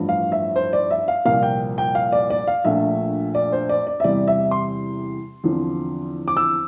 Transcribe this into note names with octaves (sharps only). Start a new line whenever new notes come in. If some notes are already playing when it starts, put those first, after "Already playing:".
Already playing: A1 G2 F3
F5
E5
C5
D5
E5
F5
C2 A#2 F3 A#3 F5
G5
G5
F5
D5
D5
F5
A#1 A#2 A3 D4 E5
D5
C5
D5
D5
E5
E2 C3 G3 D5
E5
C6
E2 D3 F3 C4
D6
E6